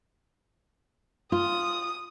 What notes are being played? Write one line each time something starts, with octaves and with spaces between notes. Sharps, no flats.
F4 D#6